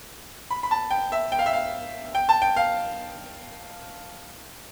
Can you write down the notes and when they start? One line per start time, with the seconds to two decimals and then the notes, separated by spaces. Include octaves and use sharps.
0.50 B5
0.63 B5
0.71 A5
0.91 G5
1.12 E5
1.32 G5
1.39 F5
1.46 E5
1.53 F5
2.15 G5
2.29 A5
2.42 G5
2.56 F5